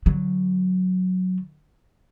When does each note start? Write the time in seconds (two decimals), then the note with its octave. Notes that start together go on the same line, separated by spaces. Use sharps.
0.06 D3 F#3